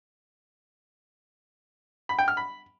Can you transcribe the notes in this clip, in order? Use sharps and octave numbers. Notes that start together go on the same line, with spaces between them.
B5
G5
F6
B5